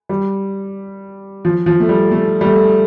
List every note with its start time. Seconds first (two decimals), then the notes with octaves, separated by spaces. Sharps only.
0.09 G3
1.45 F3
1.66 F3
1.80 A3
1.89 G3
2.11 A3
2.41 G3
2.45 A3